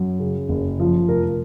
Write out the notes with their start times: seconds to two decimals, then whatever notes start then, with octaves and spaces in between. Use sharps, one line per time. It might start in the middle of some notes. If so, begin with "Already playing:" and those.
Already playing: F#2
0.20 C#3
0.49 F#1
0.80 F3
1.08 F1 A#4